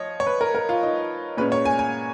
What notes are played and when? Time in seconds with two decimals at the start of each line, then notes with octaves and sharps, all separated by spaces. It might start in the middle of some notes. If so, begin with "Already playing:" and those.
Already playing: F3 C#5 D#5
0.20 C#5
0.27 B4
0.41 A#4
0.55 A#4
0.69 F4
0.83 D#4
1.37 A#2 G#3 C#4 B4
1.52 C#5
1.65 G#5
1.79 G#5